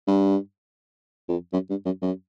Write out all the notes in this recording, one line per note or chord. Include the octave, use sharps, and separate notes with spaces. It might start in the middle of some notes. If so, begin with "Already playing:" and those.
G2
F2
F#2
G2
F#2
F#2